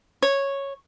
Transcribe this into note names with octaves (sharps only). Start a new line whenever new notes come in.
C#5